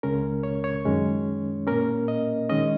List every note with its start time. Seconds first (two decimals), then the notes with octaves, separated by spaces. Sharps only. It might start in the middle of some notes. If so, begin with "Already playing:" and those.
0.03 C#2 C#3 G#3 C#4 A#4
0.43 C#5
0.64 C#5
0.85 F#2 D#3 G#3 C#4
1.67 A#2 A#3 C#4 A#4
2.08 D#5
2.49 D#3 G#3 C#4 D#5